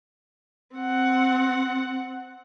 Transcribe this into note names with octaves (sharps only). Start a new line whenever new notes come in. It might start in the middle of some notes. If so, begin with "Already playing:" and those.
C4 F#5